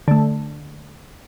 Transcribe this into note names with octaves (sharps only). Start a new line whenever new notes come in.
D3 A3